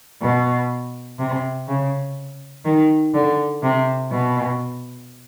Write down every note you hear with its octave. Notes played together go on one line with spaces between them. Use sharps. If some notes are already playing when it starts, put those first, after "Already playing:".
B2
C3
C#3
D#3
D3
C3
B2